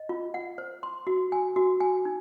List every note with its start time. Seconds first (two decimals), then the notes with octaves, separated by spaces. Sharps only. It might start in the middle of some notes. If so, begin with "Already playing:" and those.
Already playing: D#5
0.09 F4
0.34 F#5
0.58 C5
0.83 C6
1.07 F#4
1.32 G#5
1.56 F#4
1.80 G#5
2.05 D#4